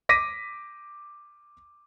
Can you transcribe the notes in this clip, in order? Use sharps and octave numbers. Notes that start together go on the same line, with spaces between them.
D6 A#6 B6 D#7